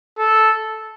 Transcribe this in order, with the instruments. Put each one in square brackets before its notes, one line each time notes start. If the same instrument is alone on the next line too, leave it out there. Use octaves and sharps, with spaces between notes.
[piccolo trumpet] A4